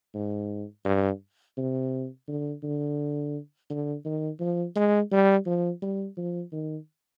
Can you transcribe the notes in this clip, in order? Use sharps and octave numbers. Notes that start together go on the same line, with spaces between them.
G#2
G2
C3
D3
D3
D3
D#3
F3
G#3
G3
F3
G3
F3
D#3